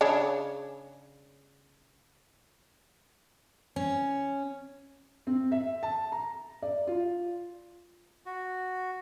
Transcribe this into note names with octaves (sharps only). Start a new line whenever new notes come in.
C#3 D4 C#5
C#4
C4
E5
A5
A#5
D5
F4
F#4